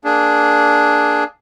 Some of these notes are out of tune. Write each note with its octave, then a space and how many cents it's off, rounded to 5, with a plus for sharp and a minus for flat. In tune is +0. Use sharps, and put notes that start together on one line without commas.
A#3 +5 D4 +0 G#4 +10